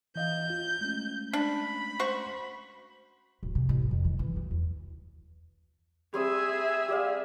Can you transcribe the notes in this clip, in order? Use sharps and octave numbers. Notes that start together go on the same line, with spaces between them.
E3 D#5 F5 G6
F4
G#3 A3 C#4
D4 B5
F#4 C5 C#6
D1
C3
A1
F2
D#3
E3
D2
E2
G3 C4 G#4 E5 D#6
G4 D5 F5